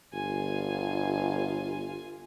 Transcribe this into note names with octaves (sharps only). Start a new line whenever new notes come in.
G1 F4 G#5